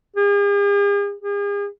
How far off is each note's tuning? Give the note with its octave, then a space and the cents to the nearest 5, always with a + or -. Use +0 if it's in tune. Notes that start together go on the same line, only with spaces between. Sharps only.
G#4 -45
G#4 -40